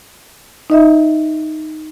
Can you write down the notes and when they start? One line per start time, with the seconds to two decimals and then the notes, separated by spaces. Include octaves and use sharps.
0.70 D#4 D#5 E5